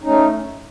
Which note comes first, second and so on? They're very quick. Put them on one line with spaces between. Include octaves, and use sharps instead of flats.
D#4 C#4 A3